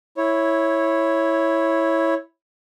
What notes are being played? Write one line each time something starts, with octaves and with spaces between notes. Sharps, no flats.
E4 C#5